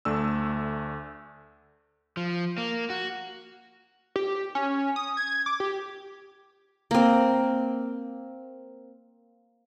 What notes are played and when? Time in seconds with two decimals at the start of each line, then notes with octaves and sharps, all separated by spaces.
0.05 D2 A3 D4 E6
2.17 F3
2.58 A#3
2.90 F#4
4.16 G4
4.55 C#4
4.96 D#6
5.17 G#6
5.46 D6
5.60 G4
6.91 A#3 C4